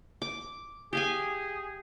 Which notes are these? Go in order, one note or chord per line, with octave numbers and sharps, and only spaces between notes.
D6
G4 G#4 F5 G#5